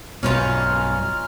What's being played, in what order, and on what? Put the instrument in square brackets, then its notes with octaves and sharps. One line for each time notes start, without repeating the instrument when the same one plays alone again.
[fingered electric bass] B1 G2 B2 [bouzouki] C#4 D#4 F4 [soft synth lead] F6